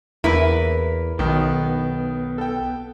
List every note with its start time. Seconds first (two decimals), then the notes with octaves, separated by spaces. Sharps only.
0.24 E2 A#3 E4 A#4 B4
1.19 B1 B2 D#3 B3
2.38 A4 G5